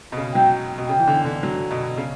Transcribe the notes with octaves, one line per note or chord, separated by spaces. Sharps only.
B2
C#3
F#3 G5
B2
C#3 G5
E3
D3
D3
F#3
B2
C#3